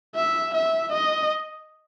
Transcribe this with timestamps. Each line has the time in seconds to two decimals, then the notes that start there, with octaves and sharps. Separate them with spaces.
0.16 E5
0.54 E5
0.92 D#5